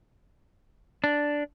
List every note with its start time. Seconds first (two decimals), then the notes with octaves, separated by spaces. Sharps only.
1.04 D4